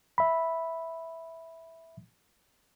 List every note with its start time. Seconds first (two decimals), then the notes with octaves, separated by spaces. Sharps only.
0.18 E5 B5